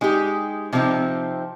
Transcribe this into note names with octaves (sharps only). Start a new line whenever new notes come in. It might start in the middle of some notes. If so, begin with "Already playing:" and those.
G#3 D#4 G4
C3 F3 C4 D#4